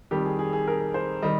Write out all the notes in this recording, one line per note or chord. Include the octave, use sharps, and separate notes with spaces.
F2 D#3 G3 G4
G#4
G#4
G#4
A#4
C5
D#3 G3 D#5